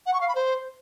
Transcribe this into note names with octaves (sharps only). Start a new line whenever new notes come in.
F#5
C#6
F5
B5
C5